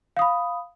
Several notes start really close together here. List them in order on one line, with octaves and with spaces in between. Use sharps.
F5 D#6 B5